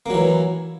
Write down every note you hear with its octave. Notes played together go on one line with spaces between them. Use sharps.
E3 F#3 A#3